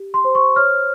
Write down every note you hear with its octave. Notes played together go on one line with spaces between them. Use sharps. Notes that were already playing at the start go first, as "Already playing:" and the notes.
Already playing: G4
C6
C5
C#6
C#5 F6